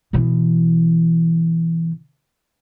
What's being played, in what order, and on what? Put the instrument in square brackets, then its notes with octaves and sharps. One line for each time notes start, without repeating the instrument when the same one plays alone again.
[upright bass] B2 E3